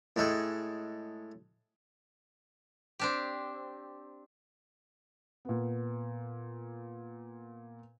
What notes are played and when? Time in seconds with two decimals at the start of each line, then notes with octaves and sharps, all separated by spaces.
0.16 A2 G#3 A4 G5
2.99 C4 D4 G4
5.45 A#2 B3